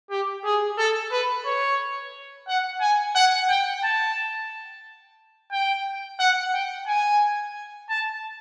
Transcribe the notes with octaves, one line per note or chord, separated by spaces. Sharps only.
G4
G#4
A4
B4
C#5
F#5
G#5
F#5
G5
A5
G5
F#5
G5
G#5
A5